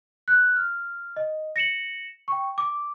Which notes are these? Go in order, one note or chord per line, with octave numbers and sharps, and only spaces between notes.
F#6
F6
D#5
A#6 C#7 E7 F#7
G5 C#6
D6